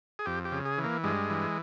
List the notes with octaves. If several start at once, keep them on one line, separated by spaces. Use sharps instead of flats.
G#4
F2 G4
G4
C#3
G#4
E3
A#3
G2 G#3
E3